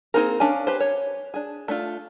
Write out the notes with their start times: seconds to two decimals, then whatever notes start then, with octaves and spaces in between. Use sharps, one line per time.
0.14 A#3 C4 D#4 G#4 A#4
0.40 C#4 D4 F5 G#5
0.67 G4 B4 C5
0.80 C#5
1.34 D4 G#4
1.68 A3 D4 F4